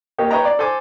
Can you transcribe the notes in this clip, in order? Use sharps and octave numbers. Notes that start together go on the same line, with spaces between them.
A#3 D#4 G4 C#5
B4 C#5 D#5 G5 A#5
D5
A4 C5 G#5 D6